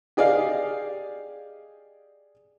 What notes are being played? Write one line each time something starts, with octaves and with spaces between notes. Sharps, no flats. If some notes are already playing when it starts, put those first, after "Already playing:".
G4 G#4 D5 D#5 F5